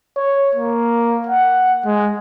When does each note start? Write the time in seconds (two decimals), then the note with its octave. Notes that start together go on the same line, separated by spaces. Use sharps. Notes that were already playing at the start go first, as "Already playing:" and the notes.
0.17 C#5
0.55 A#3
1.27 F#5
1.86 G#3